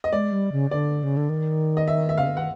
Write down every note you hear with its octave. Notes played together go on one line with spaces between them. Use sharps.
D#5
G#3 D5
G3
C#3
D3 D5
C#3
D3
D#3
D#5
E5
E5
C#3 F5
D3
D#3 F#5